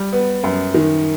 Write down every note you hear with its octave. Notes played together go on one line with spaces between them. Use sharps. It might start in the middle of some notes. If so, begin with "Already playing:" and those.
Already playing: G3
B3
F#2
D#3